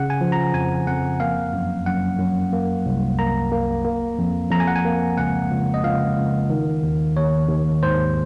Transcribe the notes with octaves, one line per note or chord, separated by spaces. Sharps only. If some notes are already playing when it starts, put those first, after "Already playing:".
Already playing: C#3 F#5
G#5
F3
A#5
F2 G#5
F2 F#5
A#3 F5
F#2
F#2 F#5
F#2
A#3
C2
A#3 A#5
A#3
A#3
F2
F2 A#5
G#5
F#5
G#5
A#3
C#2 F#5
C#2
D#5
C#2 F5
C#2
D#3
D#2
D#2 C#5
D#2
G#2 C5